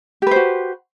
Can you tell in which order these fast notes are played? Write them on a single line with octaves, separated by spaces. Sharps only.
G4 B4 C5 F#4